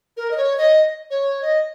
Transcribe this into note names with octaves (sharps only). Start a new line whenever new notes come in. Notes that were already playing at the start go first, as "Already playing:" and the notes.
A#4
D#5
C#5
D#5
C#5
D#5